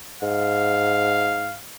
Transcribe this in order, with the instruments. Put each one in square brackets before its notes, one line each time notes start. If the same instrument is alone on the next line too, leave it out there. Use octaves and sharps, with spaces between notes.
[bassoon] G#2 [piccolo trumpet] F5